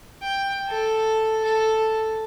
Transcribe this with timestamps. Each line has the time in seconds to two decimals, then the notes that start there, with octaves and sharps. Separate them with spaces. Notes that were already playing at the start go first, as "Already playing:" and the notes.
0.22 G5
0.68 A4
1.44 A4